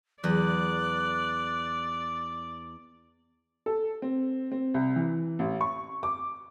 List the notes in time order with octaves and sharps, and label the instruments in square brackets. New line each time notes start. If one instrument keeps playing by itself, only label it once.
[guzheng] E2 [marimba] F#3 [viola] D5 [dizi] F#6
[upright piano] A4
C4
C4
C2
E3
A1
C#6
D6